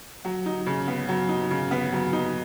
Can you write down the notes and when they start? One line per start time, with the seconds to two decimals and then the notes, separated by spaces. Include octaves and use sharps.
0.25 F#3
0.46 D#4
0.66 C#3
0.88 B3
1.09 F#3
1.29 D#4
1.51 C#3
1.71 B3
1.93 F#3
2.13 D#4